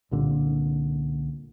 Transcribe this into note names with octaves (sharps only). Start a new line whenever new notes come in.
C2 A#2 D3